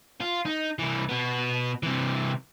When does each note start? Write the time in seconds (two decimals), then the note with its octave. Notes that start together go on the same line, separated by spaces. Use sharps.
0.21 F4
0.46 D#4
0.79 C2 E3
1.09 B2 B3
1.83 C3 E3